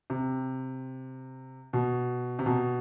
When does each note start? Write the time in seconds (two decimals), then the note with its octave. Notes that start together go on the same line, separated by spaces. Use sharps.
0.10 C3
1.73 B2
2.39 C3
2.46 B2